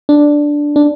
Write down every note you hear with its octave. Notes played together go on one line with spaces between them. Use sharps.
D4
D4